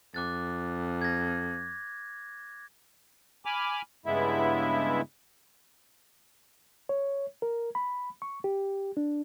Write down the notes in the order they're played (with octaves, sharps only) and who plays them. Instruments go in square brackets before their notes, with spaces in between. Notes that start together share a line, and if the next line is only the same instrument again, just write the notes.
[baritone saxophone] F2 [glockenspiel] D6 F#6 A6
[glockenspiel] G#6 A#6
[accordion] G#5 B5 D6 F6
G2 C#3 G#3 B3 E4 E5
[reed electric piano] C#5
A#4
B5
C#6
G4
D4